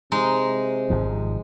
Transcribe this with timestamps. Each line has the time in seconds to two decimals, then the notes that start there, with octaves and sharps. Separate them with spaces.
0.12 C3 G#3 D#4
0.90 G#1 G#2 F3